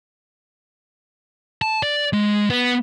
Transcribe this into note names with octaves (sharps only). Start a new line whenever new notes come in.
A5
D5
G#3
B3